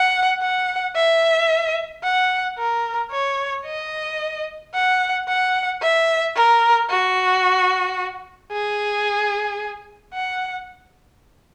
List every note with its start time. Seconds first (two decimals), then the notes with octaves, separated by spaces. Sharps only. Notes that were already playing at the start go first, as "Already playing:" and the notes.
Already playing: F#5
0.42 F#5
0.96 E5
2.04 F#5
2.58 A#4
3.11 C#5
3.65 D#5
4.74 F#5
5.28 F#5
5.82 E5
6.35 A#4
6.90 F#4
8.52 G#4
10.14 F#5